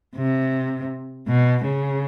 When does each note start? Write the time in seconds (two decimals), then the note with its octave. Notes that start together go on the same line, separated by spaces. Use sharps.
0.16 C3
1.28 B2
1.65 C#3